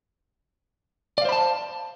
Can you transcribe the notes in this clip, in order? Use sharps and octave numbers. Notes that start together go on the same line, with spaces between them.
C5 D5 F5 A5 B5